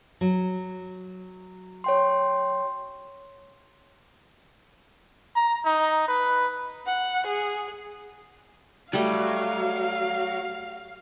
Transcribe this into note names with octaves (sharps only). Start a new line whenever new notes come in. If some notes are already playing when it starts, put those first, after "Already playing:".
F#3
C#5 G5 C6
A#5
D#4
B4
F#5
G#4
F#3 G3 A3 F5